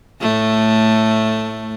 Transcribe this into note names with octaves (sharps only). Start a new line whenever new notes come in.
A2 A3